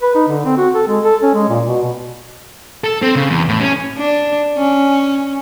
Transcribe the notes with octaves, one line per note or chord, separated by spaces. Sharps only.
B4
D#4
D3
C4
F#4
A4
G#3
A4
C#4
G#3
A#2
B2
A4
C4
C#3
E2
A2
C#4
D4
C#4